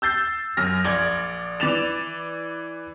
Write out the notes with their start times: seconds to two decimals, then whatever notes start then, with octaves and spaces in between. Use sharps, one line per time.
0.02 E6 G6 A6 C7
0.57 F#2 F6 A#6
0.85 A#1 D5 G#6
1.60 E3 D5 A6 E7 F7